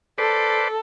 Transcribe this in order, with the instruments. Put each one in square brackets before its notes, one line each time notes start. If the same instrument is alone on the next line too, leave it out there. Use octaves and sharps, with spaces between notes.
[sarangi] A4 [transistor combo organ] B4 C5 D5